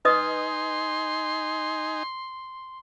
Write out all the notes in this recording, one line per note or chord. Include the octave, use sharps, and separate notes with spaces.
D#4 B4 D#5 G#5 C6 D#6